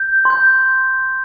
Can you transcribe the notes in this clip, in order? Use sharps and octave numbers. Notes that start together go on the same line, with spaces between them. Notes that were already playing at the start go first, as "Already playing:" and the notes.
Already playing: G6
C6
G6